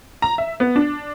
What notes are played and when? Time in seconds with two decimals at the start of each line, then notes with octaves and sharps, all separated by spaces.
0.22 A#5
0.38 E5
0.60 B3
0.76 D4